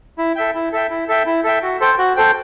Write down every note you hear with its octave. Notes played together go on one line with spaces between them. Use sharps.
E4
A4 E5 G5
E4
A4 E5 G5
E4
A4 E5 G5
E4
A4 E5 G5
F#4
A4 C5 G5
F#4
A4 C5 G5